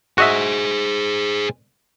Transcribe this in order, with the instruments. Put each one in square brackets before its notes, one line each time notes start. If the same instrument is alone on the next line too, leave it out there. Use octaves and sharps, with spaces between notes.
[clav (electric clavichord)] F#4 D#5 E5 [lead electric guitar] G#4 C5